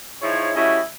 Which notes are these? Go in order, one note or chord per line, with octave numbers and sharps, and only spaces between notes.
F3 D#4 E4 G#4 C#5
G3 C#4 E4 F#4 A4 D#5